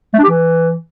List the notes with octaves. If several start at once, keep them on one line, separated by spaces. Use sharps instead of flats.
A3
D4
G4
E3